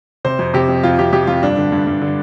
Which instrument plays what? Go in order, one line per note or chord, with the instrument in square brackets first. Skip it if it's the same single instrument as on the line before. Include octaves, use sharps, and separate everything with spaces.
[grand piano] C3 C5
F2
C3 G4
F2
F2 F4
C3 G4
F2 G4
F2 F4
G2 D4
D3
G2
G2
D3